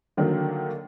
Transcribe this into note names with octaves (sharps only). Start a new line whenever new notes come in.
D3 D#3 F#3 A#3